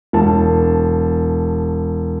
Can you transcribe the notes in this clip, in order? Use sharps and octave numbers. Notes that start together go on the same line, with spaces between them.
E1 A5